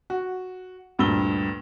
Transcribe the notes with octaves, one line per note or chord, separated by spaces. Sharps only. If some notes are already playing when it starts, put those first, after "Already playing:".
F#4
D2 G2 A#2 E6 G7